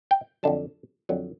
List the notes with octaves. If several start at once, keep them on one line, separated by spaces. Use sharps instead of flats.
G5
F2 D3 F#3 A5
F2 D3 F#3